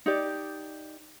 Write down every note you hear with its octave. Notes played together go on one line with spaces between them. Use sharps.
D#4 G4 D5